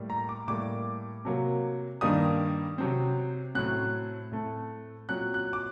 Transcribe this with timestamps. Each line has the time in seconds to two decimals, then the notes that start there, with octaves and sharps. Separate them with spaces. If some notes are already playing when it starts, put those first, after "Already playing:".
Already playing: A2 G3 A#3
0.10 A#5
0.29 D6
0.47 A2 G3 A#3 D6
1.25 C3 F#3 A#3
2.01 G2 D#3 G3 A#3 D#6
2.78 C3 F#3 C4
3.55 A2 F#3 C4 F#6
4.32 A2 A3 C4
5.09 A#2 F#3 C4 F#6
5.34 F#6
5.53 D6